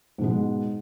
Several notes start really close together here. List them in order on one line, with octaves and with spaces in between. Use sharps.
G#2 B2 G#3